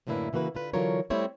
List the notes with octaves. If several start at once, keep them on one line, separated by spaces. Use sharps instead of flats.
F#2 A2 D3 A#3 E4 B4
C#3 E3 A#3 F#4 B4
D3 F4 B4
D3 E3 F#3 F4 A#4 C#5
G3 A3 C4 E4 C5 C#5